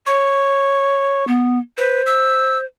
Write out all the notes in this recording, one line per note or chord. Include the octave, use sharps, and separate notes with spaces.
C#5 C#6
B3
B4 C5
E6